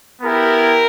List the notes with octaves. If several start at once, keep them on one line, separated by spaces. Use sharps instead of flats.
B3 E4 G4 A#4